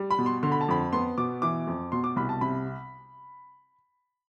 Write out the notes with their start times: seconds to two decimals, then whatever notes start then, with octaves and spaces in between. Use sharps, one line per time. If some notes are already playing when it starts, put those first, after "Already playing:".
Already playing: G3
0.11 B5
0.18 B2
0.26 C6
0.43 D3 C6
0.52 B5
0.61 A5
0.68 F2 B5
0.93 B3 C6
1.18 B2 D6
1.42 E3 D6
1.67 F2
1.92 B2 C6
2.04 D6
2.16 C2 B5
2.29 A5
2.41 C3 B5